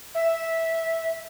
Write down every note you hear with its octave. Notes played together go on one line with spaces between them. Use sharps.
E5